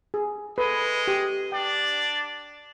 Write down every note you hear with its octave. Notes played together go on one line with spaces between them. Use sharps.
G#4
G#3 A4 B4 D#5
G4
D4 D5 G5